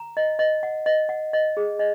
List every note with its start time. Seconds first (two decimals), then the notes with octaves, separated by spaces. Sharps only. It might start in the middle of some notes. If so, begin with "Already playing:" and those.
Already playing: A#5
0.17 D#5
0.39 D#5
0.63 F#5
0.86 D#5
1.09 F#5
1.33 D#5
1.57 G#4
1.79 D#5